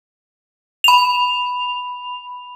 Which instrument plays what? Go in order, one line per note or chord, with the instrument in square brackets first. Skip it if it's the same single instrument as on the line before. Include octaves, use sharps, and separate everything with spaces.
[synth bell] B5 F7